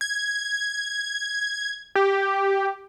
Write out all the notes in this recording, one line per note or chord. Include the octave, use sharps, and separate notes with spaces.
G#6
G4